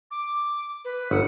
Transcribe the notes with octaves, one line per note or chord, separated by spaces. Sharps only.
D6
B4
G1 F#5